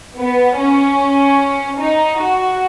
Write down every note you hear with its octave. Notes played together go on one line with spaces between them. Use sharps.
B3
C#4
D#4
F#4